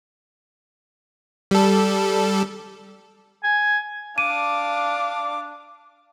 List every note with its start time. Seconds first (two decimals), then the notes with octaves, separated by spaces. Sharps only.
1.51 G3 A4
3.44 G#5
4.18 D4 F5 D6 D#7